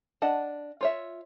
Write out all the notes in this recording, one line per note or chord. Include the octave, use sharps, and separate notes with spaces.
D4 D#5 F#5 A5
F4 C#5 E5